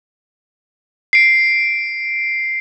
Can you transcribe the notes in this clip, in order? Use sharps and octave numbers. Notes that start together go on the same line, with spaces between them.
C7 D7